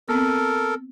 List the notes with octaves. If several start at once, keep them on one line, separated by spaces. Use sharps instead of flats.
B3 C4 A4 A#4